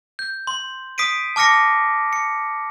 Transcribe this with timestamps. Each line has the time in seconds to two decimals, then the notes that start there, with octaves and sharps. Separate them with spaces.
0.19 G6
0.47 C6
0.98 D#6 B6 C7 D7 D#7
1.36 A5 D6 F6 A#6 C#7
2.13 C#7